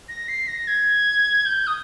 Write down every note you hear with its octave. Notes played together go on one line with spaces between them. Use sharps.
A#6
C7
A#6
G#6
G6
D#6